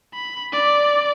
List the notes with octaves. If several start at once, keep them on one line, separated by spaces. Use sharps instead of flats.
B5
D5